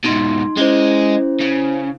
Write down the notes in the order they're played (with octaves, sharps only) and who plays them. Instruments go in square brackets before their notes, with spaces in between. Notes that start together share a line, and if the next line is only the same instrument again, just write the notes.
[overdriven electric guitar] G#2 B2 [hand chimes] D#4 C6
[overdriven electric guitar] G#3 [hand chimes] C#4 E4 C5
[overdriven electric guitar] C#3